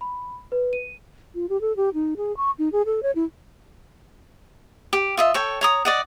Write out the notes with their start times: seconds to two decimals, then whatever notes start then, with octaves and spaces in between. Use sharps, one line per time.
0.01 B5
0.52 B4
0.73 D#7
1.35 F4
1.49 G4
1.61 A4
1.76 G4
1.94 D#4
2.17 G#4
2.37 C#6
2.59 D#4
2.72 G#4
2.86 A4
3.03 C#5
3.15 E4
4.93 G4
5.17 F4 D#5 E5
5.34 A4 C#5 G5
5.61 C#5 A#5 D#6
5.85 D5 D#5 F#5